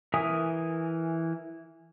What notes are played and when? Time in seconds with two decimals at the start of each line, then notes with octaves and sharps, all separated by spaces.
0.14 E3 A#4 E5 G#5 D#6